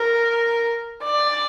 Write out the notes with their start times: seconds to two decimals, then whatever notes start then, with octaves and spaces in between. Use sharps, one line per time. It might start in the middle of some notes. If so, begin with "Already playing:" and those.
Already playing: A#4
1.04 D5